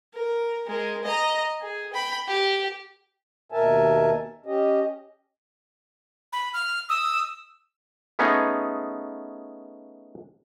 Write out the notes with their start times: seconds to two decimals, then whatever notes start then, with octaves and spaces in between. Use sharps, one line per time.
0.14 A#4
0.67 G#3 A#4
1.03 D#5 A#5
1.61 G#4
1.93 G5 B5
2.28 G4
3.52 D#2 B2 A#4 E5 G#5 A5
4.46 C#4 G4 D#5
6.33 B5
6.54 F6
6.89 D#6 E6
8.19 A3 B3 C#4 D#4 G#4